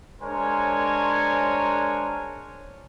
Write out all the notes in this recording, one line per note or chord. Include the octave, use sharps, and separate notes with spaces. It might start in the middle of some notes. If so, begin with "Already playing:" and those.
G#3 D4 A#4 C5 C#5 G#5